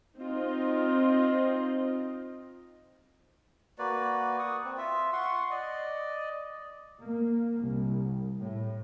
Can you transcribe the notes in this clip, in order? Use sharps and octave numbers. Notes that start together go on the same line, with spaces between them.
C4 D#4 F4 D#5
A#3 F#4 B4 D5
C#6 D#6
C4
F4 E5
F#5 C6 C#6
D5 D#5
A#3
C2
A2